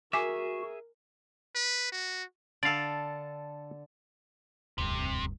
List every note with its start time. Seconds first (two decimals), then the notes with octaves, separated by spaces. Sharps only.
0.13 F#4 G#4 A#4 E5 G#5 D6
1.55 B4
1.92 F#4
2.63 D3 A4 D5 F5
4.78 E1 D2 G2 C3